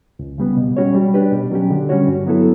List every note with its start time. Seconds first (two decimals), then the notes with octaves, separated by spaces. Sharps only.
0.19 C#2
0.38 C#3 G3 B3
0.57 B2
0.77 G3 C#4 F#4 C#5
0.95 G3
1.14 D4 G4 B4
1.32 B2
1.51 F#3 C#4 G4
1.70 D3
1.89 G3 C#4 F#4 C#5
2.07 G2
2.27 F#3 B3 E4 A4